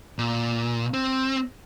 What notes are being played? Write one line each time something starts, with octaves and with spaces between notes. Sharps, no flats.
A#2
C4